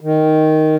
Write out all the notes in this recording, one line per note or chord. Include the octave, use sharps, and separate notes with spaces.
D#3